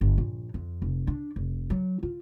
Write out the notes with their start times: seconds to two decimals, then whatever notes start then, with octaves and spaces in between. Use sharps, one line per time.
0.01 G1
0.18 A#1
0.54 F2
0.82 F1
1.07 D4
1.36 F1
1.70 F#3
2.03 F4